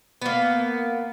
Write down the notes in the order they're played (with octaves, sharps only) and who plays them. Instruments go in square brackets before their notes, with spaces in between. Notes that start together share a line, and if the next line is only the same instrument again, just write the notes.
[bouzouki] A#3 B3